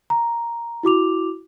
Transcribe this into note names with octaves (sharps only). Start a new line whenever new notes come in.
A#5
E4 F#4 D6 F7